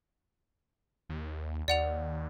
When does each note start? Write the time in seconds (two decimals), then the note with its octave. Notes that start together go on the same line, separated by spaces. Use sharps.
1.09 D#2
1.68 D#2 D5 F#5 F7